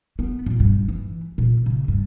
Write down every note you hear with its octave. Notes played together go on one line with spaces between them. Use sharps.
B3
A#2
G2
E3
A#2
C#3
G2